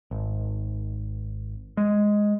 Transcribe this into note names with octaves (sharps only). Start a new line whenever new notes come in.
G#1
G#3